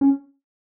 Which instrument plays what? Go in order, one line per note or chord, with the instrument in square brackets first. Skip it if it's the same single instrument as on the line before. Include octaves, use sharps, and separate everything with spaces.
[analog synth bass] C#4